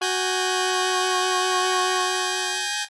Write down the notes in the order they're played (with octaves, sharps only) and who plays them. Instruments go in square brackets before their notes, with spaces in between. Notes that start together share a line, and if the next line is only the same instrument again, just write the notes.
[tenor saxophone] F#4 [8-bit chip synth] G#5 G6 A#6